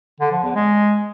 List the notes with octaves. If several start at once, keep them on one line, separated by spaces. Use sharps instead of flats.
D3
F3
E2
G#3